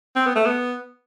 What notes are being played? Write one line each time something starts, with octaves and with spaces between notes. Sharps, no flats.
C4
B3
A3
B3